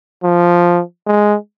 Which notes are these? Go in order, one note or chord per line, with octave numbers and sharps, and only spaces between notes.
F3
G#3